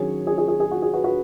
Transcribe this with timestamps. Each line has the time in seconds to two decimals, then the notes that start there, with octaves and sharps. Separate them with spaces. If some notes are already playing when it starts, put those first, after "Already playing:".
Already playing: D#3 F#3 C#4 G#4 C#5
0.27 G#4
0.38 G#4
0.48 G#4
0.60 G#4
0.71 F#4
0.82 G#4
0.94 F#4 B4
1.04 F#4 B4